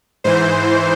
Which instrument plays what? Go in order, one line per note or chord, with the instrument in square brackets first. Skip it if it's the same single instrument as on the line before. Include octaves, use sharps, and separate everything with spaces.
[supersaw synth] G#2 E3 C5